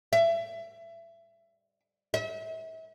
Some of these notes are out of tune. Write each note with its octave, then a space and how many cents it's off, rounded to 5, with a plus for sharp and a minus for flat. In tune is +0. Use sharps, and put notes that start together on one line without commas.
E5 +25
E5 -35